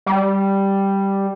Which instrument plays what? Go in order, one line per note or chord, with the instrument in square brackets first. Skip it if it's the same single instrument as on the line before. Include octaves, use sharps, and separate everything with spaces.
[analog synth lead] G3